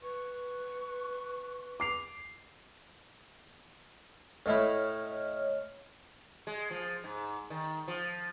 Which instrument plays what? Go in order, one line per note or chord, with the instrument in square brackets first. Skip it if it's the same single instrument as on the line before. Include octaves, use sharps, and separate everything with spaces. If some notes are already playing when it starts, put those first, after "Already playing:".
[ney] B4 [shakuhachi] C#6
[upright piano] D6 C7 F7
[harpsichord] A2 A3 E4 [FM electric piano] C#5 D#5 F6
[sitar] G#3
F3
G#2
D#3
F3